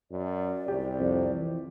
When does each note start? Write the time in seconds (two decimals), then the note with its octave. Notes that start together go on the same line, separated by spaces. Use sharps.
0.11 F#2 D5
0.68 C2 G4
0.99 F2
1.33 E3